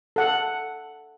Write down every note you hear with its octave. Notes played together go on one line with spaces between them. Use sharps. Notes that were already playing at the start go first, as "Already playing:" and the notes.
A4 F#5